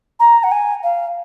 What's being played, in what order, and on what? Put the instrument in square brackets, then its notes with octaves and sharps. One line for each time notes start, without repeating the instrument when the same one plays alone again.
[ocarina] A#5
F#5
G#5
F5